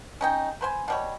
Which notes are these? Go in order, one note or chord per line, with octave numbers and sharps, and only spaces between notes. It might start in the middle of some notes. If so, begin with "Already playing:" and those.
C#4 D#4 G5
B4 C5 G#5
B2 G3 C#5